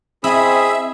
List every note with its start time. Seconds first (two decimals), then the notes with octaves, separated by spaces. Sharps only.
0.24 C4 E4 G#4 D#5 E5 B5 D#6